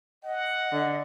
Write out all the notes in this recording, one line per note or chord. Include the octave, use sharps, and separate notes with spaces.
D#5 F#5
D3